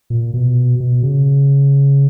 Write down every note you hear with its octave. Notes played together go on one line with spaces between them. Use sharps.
A#2
B2
B2
C#3